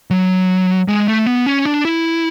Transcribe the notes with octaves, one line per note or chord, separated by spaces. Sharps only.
F#3
G#3
A3
B3
C#4
D4
E4